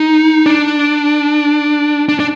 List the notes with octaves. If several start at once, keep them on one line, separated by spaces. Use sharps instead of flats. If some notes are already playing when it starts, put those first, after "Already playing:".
Already playing: D#4
D4
D4
D4